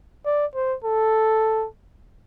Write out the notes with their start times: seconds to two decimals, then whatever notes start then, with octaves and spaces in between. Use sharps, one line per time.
0.26 D5
0.55 C5
0.85 A4